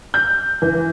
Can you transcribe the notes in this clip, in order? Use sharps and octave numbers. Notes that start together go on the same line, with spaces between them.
G6
E3